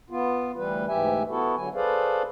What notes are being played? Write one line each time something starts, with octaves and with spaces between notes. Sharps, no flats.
B3 F4
D2 E3 G3 B4
D2 G#2 E3 G4 E5 G#5
B3 E4 F#4 A4
D3 F#3 G#5
G#4 A4 B4 C5 D5 F5